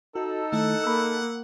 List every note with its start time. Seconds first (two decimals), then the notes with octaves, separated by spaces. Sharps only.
0.15 D#4 F#4 A4
0.52 D#3 A3 E4 F#5
0.84 A#3 B5 E6